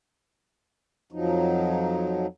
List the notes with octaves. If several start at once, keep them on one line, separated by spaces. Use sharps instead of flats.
F2 F3 F#3 D#4